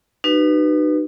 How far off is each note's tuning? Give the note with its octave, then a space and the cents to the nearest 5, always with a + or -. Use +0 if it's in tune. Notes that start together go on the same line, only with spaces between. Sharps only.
D#4 -35 F#4 +35 B4 +0